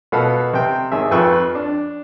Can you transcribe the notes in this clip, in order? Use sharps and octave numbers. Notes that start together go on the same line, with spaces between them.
B2 A4 F5 F#5 B5
C3 G5
G#1 G#4 E5
F2 F4 B4 G5 C#6 E6
D4